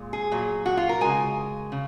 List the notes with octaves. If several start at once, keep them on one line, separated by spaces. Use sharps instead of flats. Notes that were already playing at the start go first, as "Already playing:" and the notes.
Already playing: A#2 G#3
G#4
A#2 F#3
F#4
F4
A#4
C#3 G#3 G#5
C#3